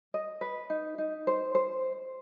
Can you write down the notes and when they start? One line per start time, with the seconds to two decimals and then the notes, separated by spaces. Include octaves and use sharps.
0.14 D#5
0.41 B4
0.70 D#4
0.98 D#4
1.27 C5
1.55 C5